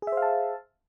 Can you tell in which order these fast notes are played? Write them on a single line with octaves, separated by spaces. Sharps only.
G#4 E5 C5 F5 A5